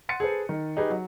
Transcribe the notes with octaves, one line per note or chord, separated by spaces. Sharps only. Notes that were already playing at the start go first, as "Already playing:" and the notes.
F#5 C6 A6 C#7 D#7
G#4 A4 B4 C5
D#3
D#4 G4 G#4 B4
F#3